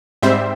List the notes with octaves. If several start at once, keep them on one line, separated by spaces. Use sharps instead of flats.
G#2 G3 C4 C5 E5